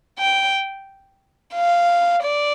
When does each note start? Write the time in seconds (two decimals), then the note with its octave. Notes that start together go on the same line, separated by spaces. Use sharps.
0.19 G5
1.54 F5
2.23 D5